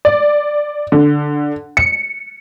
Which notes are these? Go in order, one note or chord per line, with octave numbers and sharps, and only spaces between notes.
D5
D3
C#7